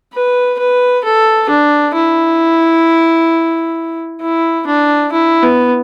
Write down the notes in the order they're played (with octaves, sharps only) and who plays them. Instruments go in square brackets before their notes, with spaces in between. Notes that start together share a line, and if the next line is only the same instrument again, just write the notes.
[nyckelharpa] B4
B4
A4
D4
E4
E4
D4
E4
B3